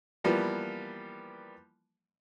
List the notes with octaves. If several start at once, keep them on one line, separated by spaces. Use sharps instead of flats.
E3 F3 G3 A#3 B3